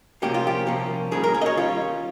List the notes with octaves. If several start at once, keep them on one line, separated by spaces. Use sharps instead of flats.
C2 A#2 F3 A#3 C#4 G4
F4
G4
C2 A#2 F3 A#3 C#4
D#2 D#3 G3 C#4 G#4
A#4
G#4
D#5
C#5
D#3 G3 C#4 F4